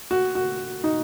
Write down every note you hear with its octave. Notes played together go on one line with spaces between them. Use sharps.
F#4
F#4
D#4